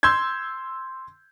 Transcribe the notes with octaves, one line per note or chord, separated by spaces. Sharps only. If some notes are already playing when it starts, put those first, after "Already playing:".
C6 E6 G6 G#6